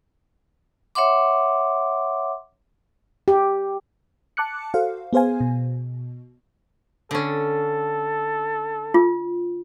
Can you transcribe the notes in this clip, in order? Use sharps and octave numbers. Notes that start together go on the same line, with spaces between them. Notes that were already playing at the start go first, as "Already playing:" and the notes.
C#5 E5 F#5 C6 D6
G4
A5 D6 F#6 C#7
F#4 A4 C5 F5
B3 G#4 C5 F5 G#5
B2
D3 C#4 A4
F4